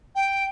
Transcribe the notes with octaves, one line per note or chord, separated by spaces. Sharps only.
G5